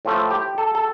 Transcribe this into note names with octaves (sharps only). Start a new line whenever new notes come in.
A2 F3 A3
G4
A4
A4